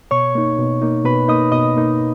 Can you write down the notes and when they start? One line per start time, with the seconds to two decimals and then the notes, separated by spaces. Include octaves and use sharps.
0.11 B2 C#5 C#6
0.35 A#3 D#4
0.58 B2
0.82 A#3 D#4
1.05 B2 B4 B5
1.28 A#3 D#4 D#5 D#6
1.52 B2 D#5 D#6
1.77 A#3 D#4